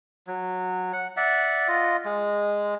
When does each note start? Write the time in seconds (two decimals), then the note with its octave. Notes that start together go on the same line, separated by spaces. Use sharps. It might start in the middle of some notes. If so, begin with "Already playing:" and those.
0.27 F#3
0.93 F#5
1.17 D5 E5 F#5
1.68 F4 D#5
2.05 G#3